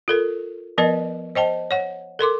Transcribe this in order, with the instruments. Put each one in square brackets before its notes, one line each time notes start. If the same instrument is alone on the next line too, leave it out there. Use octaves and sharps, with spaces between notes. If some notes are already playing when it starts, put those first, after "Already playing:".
[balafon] F4 A4 A#4
F3 B3 A#4 B4 D#5
C5 D#5 G5 A5
C#5 F#5
A4 A#4 C6 D6